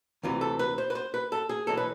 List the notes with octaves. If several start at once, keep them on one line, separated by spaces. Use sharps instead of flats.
D2 C3 E3 F4
A4
B4
C5
B4
C5
B4
A4
G#4
B1 A2 E3 A4
B4